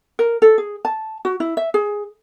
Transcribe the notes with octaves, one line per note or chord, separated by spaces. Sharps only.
A#4
A4
G#4
A5
F#4
E4
E5
G#4